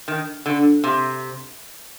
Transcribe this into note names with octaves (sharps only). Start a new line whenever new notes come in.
D#3
D3
C3